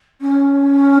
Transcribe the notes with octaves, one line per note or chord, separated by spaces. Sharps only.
C#4